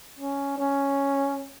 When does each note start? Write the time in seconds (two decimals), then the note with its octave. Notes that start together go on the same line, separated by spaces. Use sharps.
0.19 C#4
0.58 C#4